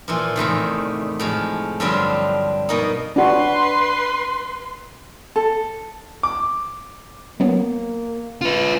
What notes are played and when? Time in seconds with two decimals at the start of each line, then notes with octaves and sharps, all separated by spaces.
0.08 A#2 E3 F3
0.36 E2 A2 C3 D#3
1.20 A2 F3 G#3
1.80 G2 D3 F3 F#3 C4 D4
2.69 B2 A#3 D#4
3.16 D4 F#4 B4 C6
5.36 A4
6.23 D6
7.40 F#3 A#3 B3
8.42 F4 B4